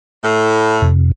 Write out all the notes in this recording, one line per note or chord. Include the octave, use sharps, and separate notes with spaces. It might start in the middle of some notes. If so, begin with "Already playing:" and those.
A2
F2 C3